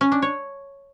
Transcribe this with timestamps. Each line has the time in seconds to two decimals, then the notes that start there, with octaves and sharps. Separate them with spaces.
0.01 C#4
0.12 D4
0.22 C#5